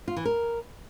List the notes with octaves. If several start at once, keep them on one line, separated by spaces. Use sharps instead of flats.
F4
E3
A#4